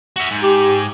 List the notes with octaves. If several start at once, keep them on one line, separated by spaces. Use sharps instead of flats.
F#4 E5
G#2
G4